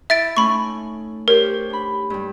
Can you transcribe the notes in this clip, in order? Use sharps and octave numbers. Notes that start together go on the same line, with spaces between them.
E4 E5 A6 D7
A3 C#4 D#4 B5 C#6
G4 A#4 C5 C#5
D4 B5
G2 G3